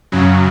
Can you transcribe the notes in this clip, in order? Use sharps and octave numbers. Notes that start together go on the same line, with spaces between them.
F#2 C#3 F#3